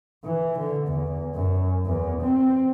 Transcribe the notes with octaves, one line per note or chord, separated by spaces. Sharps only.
E3
D3
E2
F#2
E2
C4